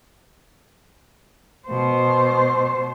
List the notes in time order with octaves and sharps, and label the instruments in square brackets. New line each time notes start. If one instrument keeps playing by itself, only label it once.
[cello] B2 C5